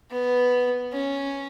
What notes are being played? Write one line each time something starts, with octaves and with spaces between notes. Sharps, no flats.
B3
C#4